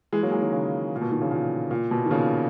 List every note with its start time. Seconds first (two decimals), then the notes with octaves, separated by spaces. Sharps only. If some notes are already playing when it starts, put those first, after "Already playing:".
0.12 E3 G#3
0.23 F#3 A#3
0.32 E3 G#3
0.42 D#3 F#3
0.52 C#3 E3
0.96 A#2
1.01 B2
1.12 B2 D#3
1.21 C#3 E3
1.31 A#2
1.71 A#2
1.91 B2
2.06 D#3
2.11 A#2 C#3